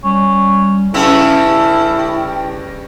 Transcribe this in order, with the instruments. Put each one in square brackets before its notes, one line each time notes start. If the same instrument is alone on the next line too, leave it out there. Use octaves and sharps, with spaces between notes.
[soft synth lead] G3 [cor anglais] C#4
[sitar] G2 C#3 C#4 [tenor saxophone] E4 [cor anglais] A4 [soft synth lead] G5